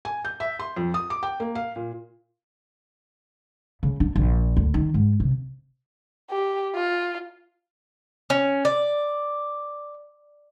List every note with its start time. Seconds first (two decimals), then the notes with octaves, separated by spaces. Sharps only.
0.05 G#5
0.25 G6
0.40 E5
0.59 C6
0.76 F2
0.94 D#6
1.10 D6
1.23 G5
1.40 A#3
1.55 F5
1.76 A#2
3.83 C#3
4.00 D4
4.16 A#1
4.57 D2
4.74 D#3
4.94 G#2
5.20 C3
6.30 G4
6.75 F4
8.30 C#4
8.65 D5